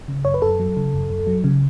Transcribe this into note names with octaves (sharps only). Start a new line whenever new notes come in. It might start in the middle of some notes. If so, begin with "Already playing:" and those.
C#3
F#2 C#5
B4
F#2 A4
F#3
C#3
F#2
F#2
F#3
C#3